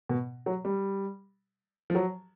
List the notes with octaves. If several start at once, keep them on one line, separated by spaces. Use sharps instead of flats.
B2
F#3
G3
F3
F#3